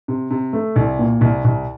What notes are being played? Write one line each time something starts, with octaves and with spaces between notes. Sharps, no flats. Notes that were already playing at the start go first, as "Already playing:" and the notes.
C3
C3
A3
C2
A#2
C2
C2